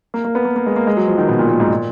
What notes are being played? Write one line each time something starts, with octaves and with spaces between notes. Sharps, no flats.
A#3
A#3
B3
A#3
A#3
G#3
A#3
G#3
F#3
F3
D#3
B2
A#2
A#2
G#2
A#2